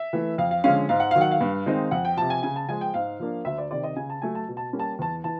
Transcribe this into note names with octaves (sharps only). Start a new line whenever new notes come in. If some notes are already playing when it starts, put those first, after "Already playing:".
Already playing: E5
E3 A3
F2 F5
F5
D3 F3 G#3 C#4 F5
G#2 F5
F#5
D#3 F#3 F5
F#5
F5
G2
D#3 G#3 C4 D#4
F2 F#5
G5
C3 F3 A5
G#5
C#3 G#5
A5
F3 G#3 G#5
G5
G#2 F5
F3 A#3 D4
D2 E5
D5
C3 D#3 D5
D#5
C#3 G#5
A5
F#3 A3 G#5
A5
B2
A5
G3 A#3 C#4
A5
E2 A5
E3 A5